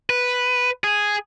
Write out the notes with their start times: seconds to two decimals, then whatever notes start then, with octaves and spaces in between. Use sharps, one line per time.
0.10 B4
0.84 G#4